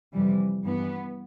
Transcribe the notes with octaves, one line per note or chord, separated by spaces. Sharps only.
F2 C3 E3 G3
G2 E3 B3